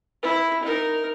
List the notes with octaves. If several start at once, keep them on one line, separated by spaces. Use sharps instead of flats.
E4
D#4 A#4